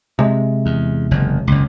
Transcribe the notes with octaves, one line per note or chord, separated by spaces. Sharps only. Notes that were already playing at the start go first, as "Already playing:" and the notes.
C3 G#3
E2
F#1 E2
F#1 C#2